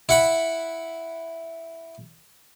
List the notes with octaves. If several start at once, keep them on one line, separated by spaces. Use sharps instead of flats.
E4 F#5 B5